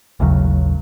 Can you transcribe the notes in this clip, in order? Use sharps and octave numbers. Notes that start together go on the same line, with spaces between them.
A1 D#2 C#3 F#3